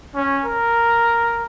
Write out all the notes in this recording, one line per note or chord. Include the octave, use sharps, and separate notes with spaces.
C#4
A#4